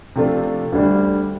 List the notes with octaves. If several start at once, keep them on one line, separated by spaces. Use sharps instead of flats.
C3 F3 A3 D4 F4
D2 D3 G3 D4